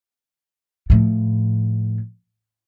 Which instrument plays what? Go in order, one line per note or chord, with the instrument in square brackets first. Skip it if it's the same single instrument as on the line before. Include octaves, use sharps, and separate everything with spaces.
[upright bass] A2 F3